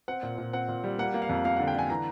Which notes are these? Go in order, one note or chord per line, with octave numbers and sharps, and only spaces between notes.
C4 F#5
A#2
A#2
C4 F#5
A#2
G3
A#3 F#5
A#3
F5
F2
A#3 F5
D3 F#5
G5
D3 G#5
E3 A#5